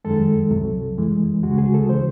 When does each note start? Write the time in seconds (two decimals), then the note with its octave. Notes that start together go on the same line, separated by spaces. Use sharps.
0.05 F#2 D#3 G#3 A4
0.51 C2 C3 F#3
0.97 F#2 E3 G#3
1.43 C#2 C#3 G#3 F#4
1.58 G#4
1.74 A4
1.89 C#3 E3 C5